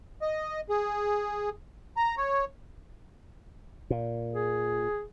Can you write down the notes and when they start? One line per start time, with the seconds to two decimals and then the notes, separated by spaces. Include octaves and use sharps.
0.22 D#5
0.69 G#4
1.97 A#5
2.17 C#5
3.90 A#2
4.33 G#4